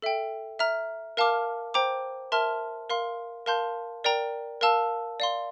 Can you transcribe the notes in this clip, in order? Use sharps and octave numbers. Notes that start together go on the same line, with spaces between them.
A4 E5 G5
E5 A#5 F6
A#4 F5 A5 D6 F6
C5 G5 A#5 D6
A#4 E5 A5 C6 F6
A#4 F5 C6
A#4 F5 A5 C6 G6
A#4 D5 G5 A#5
A#4 F5 A5 E6
D5 F5 C6